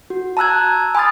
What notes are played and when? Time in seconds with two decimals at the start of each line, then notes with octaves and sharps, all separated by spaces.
0.10 F#4
0.37 A5 A#5 E6 F#6 G#6
0.95 G#5 B5 C6 D#6 F6 A6